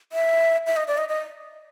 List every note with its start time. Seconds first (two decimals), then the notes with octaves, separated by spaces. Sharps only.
0.12 E5
0.67 E5
0.76 D#5
0.88 D5
0.98 D#5
1.09 D#5